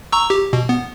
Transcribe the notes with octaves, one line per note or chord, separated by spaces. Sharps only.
A#5 C#6 E6
G4
B2
B3